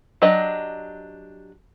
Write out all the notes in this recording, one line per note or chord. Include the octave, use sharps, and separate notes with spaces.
F#3 D4 G4 D#5